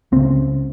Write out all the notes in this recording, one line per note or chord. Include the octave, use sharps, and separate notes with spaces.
C#2 C#3 C4